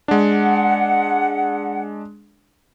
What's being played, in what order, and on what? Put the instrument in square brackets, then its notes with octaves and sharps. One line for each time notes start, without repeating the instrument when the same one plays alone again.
[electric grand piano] G#3 D4 [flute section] F#5